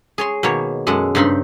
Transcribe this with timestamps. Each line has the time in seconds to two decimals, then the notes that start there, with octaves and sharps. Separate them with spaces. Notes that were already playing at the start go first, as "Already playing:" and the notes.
0.18 G#4 C#5 C6
0.43 B2 D#3 A#3 C#5
0.87 F#2 G#3 A4 F#5 A5
1.15 G2 C#3 C4 D#4 B5 C6